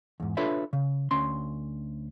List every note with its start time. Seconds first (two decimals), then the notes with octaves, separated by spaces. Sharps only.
0.20 E2 G#2
0.37 D4 F4 A4 B4 C#5 E5
0.73 C#3
1.11 D2 C#4 C6